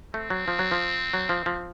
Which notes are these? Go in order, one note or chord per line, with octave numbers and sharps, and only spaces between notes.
A3 C4
F#3
F3
F#3
F3
F#3
F3
F3